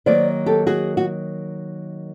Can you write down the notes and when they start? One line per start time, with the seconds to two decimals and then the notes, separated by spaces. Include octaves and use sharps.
0.06 D#3 F#3 A#3 C5 D5
0.46 G4 A4
0.67 F#4 G#4
0.97 F#4